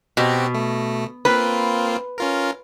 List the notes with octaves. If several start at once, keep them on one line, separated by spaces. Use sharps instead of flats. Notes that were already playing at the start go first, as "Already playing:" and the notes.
B2 C4 F#4 G4
A3
A#3 C4 F4 B4
C#4 F4 A#4